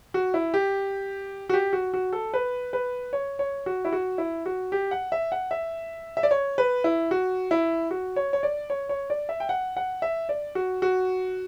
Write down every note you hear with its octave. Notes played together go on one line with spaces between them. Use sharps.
F#4
E4
G4
F#4
G4
F#4
F#4
A4
B4
B4
C#5
C#5
F#4
E4
F#4
E4
F#4
G4
F#5
E5
F#5
E5
E5
D5
C#5
B4
E4
F#4
E4
F#4
C#5
C#5
D5
C#5
C#5
D5
E5
G5
F#5
F#5
E5
D5
F#4
F#4